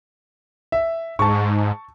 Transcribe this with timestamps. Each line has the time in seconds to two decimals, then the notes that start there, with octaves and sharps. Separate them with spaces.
0.72 E5
1.19 G#2 A5 C#6